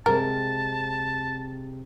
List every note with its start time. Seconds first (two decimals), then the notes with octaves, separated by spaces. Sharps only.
0.06 C3 G#3 C4 A#4 A5